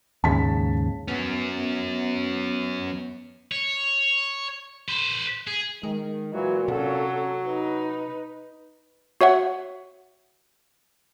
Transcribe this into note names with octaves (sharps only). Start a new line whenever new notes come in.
D#2 G#2 C#3 A5 B6
F#3 B3 C#4
C#5
B4 C5
G#4
D#3 G#3
A#2 E3 F#3
C3 F#3 C#4 A4
D#4 B4
F#4 C#5 E5 F#5